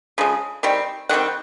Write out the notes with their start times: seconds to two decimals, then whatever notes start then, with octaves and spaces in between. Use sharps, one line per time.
0.18 C#3 F3 G#3
0.63 D#3 G3 C4
1.09 D#3 G3 C4 F#5